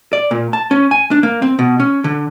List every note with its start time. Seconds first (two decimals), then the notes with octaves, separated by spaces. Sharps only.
0.13 D5
0.31 A#2
0.53 A5
0.71 C#4
0.91 G#5
1.11 D4
1.23 A#3
1.42 C4
1.59 B2
1.80 C#4
2.04 D3